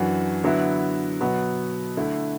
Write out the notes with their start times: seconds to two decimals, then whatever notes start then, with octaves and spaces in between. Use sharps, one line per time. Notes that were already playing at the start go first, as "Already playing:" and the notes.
Already playing: F#2 E3 D4 F#4
0.44 D3 F#3 B3 E4
1.20 B2 F#3 B3 F#4
1.97 D3 A3 E4